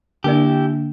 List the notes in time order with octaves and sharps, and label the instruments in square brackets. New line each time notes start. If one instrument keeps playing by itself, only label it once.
[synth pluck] D3 A#3 D4 [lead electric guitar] E4 G4